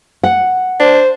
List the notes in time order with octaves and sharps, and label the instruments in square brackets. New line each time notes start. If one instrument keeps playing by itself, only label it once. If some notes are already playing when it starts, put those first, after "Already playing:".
[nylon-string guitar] F#5
[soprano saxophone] D4 [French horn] C5